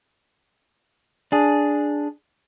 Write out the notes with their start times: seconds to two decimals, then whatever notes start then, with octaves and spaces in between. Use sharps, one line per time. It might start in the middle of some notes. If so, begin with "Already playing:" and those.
1.32 D4 G#4